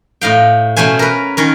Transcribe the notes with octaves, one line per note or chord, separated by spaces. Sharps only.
A2 D#5 F5 G5
B2 A3 C#4 C5 G#5
A#4 B4
D#3 C#4 A#4